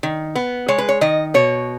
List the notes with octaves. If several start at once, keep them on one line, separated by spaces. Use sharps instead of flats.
D#3
B3
G#3 C#5
B4
C#5
D#3 D#5
B2 C#5